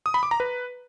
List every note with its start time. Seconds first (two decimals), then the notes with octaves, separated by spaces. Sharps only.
0.06 D#6
0.14 B5
0.23 D6
0.31 A#5
0.40 B4